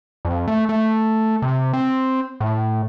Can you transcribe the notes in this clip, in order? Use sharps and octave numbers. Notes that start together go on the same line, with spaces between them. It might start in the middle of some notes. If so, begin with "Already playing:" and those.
F2
A3
A3
C3
C4
A2